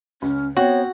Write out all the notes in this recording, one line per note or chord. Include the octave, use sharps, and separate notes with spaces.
C#2 C#4
B3 C4 F#4 C#5